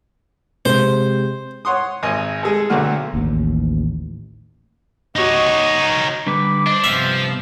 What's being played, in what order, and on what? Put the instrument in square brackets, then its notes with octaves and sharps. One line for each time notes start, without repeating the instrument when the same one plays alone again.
[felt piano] C3 G#3 [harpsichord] C5
[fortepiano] C#5 F#5 C6 D#6
G#1 D#5 G#5 D#6
G#3 G#4 A4
B1 D3 F#3 A3 F#4 F6
[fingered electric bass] A1 D#2
[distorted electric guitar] D#4 C#5 [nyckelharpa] F#4 D#5
[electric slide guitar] D3 G3 B4 [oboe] D6
[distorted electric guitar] D4 [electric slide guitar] C5 D#5
[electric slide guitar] G2 C3 B3 [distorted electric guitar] F3 [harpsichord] E5